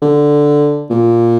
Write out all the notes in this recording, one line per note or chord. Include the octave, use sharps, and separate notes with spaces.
D3
A#2